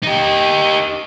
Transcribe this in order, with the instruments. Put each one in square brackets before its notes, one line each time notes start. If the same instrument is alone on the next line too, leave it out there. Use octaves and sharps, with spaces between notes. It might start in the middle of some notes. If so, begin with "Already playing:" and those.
[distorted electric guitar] D#4 G4